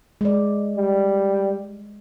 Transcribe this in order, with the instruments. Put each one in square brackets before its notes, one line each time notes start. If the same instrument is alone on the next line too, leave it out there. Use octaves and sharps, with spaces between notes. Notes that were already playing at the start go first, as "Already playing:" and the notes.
[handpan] G#3 D5
[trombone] G3